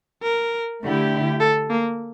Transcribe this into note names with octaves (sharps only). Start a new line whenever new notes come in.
A#4
D3 A3 E4 G4
A4
A#3